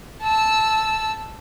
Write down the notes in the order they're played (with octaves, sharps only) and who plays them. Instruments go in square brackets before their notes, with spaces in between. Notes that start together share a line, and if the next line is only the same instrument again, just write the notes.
[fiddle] A5 E6